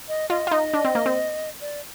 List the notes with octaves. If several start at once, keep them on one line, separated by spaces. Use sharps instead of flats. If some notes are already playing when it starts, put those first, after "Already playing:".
D#5
F4 D#5
F4
D#4 D#5
D4
C4
A#3
C4
D5